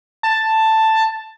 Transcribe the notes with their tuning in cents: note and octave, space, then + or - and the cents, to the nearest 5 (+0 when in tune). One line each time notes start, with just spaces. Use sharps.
A5 +5